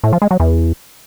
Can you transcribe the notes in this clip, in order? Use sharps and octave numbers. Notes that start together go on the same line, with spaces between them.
A2
F3
G#3
F#3
E2